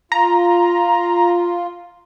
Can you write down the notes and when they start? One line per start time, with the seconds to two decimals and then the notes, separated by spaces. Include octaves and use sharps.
0.12 F4 A#5